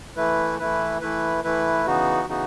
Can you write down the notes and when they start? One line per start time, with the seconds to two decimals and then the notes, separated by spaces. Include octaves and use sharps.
0.16 E3 A3 E4 B4
0.59 E3 A3 E4 B4
1.01 E3 A3 E4 B4
1.44 E3 A3 E4 B4
1.85 C#3 E3 B3 D#4 F#4
2.28 C#3 E3 B3 D#4 F#4